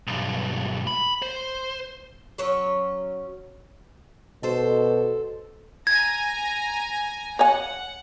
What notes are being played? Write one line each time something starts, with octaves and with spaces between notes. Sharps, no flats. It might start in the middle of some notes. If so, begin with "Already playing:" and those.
B1 G2
B5
C5
F#3 C#4 C#5
B2 A4 C5
G#5 A#5 G#6 A#6
C#5 F5 F#5 G#5